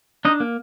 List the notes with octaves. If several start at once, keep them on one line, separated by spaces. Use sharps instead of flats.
D4 D#4 D#5
A#3